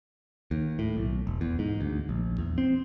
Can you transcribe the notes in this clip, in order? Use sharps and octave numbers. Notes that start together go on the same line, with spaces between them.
D#2
A2
B1
E1
E2
G#2
D2
A#1
E2
C4